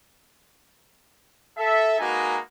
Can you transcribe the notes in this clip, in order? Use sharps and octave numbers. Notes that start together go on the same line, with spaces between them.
A4 E5
G#3 A#3 D#4 F#4 B4 G#5